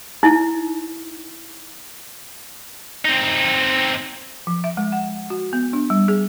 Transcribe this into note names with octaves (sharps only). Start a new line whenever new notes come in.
D#4 E4
C4 D#4
F3
E5
G#3
F#5
F#4
B3
D4
G3
G#4